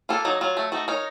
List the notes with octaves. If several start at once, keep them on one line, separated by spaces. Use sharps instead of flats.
A#3 F4 A4
F#3 D#4
F#3 F4
A3
A3 D#4 F#4
D#4 A#4 C#5